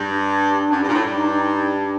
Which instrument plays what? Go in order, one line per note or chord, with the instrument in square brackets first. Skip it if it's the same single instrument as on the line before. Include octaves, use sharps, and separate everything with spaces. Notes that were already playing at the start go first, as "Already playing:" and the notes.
Already playing: [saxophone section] G2
[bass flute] D4
[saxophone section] F#2
G2
A#2
A2
G2
[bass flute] D#4
D#4
D#4
D4